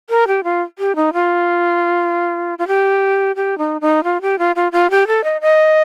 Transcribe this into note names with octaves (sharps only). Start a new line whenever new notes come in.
A#4
G4
F4
G4
D#4
F4
F4
G4
G4
D#4
D#4
F4
G4
F4
F4
F4
G4
A4
D#5
D#5